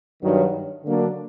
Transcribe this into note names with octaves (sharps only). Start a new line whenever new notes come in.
G2 D#3 F#3
D3 F#3 A#3 D4